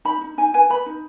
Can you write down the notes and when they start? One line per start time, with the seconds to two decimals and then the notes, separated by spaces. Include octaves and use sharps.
0.05 D#4 B5
0.21 D#4
0.38 D#4 G#5
0.54 B4 G#5
0.70 B4 B5
0.86 D#4